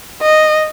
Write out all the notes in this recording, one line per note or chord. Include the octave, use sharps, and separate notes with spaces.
D#5